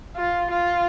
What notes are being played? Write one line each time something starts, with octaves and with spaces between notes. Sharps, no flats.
F4
F4